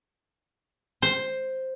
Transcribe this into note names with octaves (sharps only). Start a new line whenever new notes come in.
C5